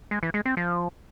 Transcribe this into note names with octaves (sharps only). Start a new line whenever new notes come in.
G#3
E3
G#3
C4
F3